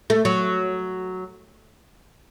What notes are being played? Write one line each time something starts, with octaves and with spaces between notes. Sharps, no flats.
A3
F#3